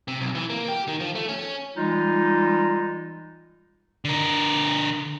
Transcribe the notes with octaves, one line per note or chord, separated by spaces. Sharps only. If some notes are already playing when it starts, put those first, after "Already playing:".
C3
B1
E3
A#3
G4
D#3
F3
A3
C#4
E3 G3 G#3 D#4 F4
D3 A#4